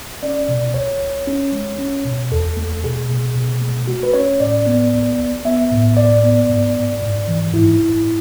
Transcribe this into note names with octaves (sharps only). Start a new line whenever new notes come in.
C#4 D5
B2
B1 C#5
B1
C#4
G#3
C#4
B2
E2 A4
A3
B2 G#4
B2
B2
A3
A3 F#4
B4
C#4 C#5
A2 D5
B3
B1
B1
B3 E5
A2
B1 D5
B3
G#2
G#2
G#2
E3
G#2 E4
G#2